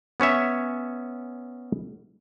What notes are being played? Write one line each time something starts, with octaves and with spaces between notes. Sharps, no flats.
B3 C#4 C#5 E5